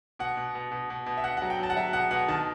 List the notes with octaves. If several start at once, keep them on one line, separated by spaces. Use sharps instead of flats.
B2 F#5
B2
B2
B2
B2
B2
E5
B2 F#5
F#3 F#5
G5
F#3 A5
F#5
F#3 E5
B2 F#5
B2 F#5
D#3 A5